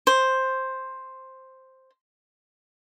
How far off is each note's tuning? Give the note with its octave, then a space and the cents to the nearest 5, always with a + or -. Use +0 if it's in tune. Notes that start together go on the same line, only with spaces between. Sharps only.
C5 +5